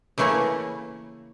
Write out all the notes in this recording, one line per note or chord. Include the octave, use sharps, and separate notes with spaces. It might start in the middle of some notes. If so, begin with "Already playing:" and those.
C#3 E3 A3 A#3 C#4